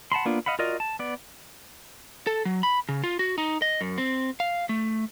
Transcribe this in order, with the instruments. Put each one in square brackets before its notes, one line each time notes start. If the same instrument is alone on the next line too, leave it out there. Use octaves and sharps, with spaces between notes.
[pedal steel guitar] F#5 A5 B5 C6
A#3 B3 D4 F4
D#5 F5 F#5 B5
F4 F#4 A#4 D5 D#5
A5
B3 D5
[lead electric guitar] A4
F#3
B5
C#3
F4
F#4
D#4
D#5
F#2
C4
F5
A3